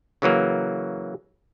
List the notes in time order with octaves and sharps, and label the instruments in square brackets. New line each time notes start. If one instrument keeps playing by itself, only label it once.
[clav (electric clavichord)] C#3 E3 F#3 A#3